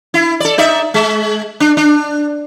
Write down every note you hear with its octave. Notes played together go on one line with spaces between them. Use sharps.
E4
A4 D5
D#4 D5 E5
G#3
D4
D4